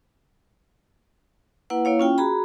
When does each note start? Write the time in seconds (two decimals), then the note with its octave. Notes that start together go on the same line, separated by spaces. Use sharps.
1.70 A#3 E4 B4 F#5
1.85 A#3 E4 C#5 F5
1.99 C#4 F4 G5
2.18 F#4 G#4 A#5 B5